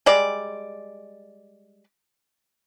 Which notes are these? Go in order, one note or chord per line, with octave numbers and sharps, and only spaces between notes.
G3 G#3 D5